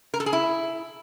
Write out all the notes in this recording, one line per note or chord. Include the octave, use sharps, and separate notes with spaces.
A#4
A4
G#4
E4